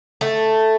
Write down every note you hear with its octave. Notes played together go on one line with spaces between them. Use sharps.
A3